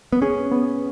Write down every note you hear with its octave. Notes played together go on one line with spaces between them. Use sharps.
B3
C#4 G#4
B3